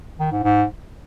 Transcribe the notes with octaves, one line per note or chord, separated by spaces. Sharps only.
D#3
G#2
G#2